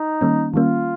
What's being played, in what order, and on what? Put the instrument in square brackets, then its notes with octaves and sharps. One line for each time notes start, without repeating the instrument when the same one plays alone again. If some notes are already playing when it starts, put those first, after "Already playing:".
Already playing: [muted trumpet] D#4
[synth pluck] D#3 G3 A#3 C#4
[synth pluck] D#3 G3 A#3 C#4 [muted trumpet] F4